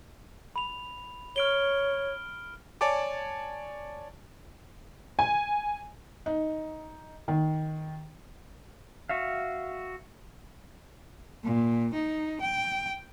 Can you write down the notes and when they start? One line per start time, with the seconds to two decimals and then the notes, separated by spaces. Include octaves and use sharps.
0.56 B5 F7
1.36 C#5 F6 D7 G7
2.81 C#5 D5 G#5 A5 D6
5.19 G#5
6.26 D#4
7.28 D#3
9.09 F#4 E5 F5
11.44 A#2
11.94 D#4
12.41 G5